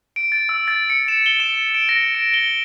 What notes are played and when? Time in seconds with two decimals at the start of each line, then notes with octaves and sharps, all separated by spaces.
0.16 D7
0.32 A6
0.49 E6
0.68 A6
0.90 C#7
1.08 E7
1.26 G7
1.40 E7
1.75 D7
1.89 A#6
2.15 D7
2.34 G7